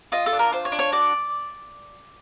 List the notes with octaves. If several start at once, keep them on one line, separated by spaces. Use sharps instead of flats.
F4 D#5
A4
D4
A#4
F4 C5
C#5
D4
C#5
F#4 D5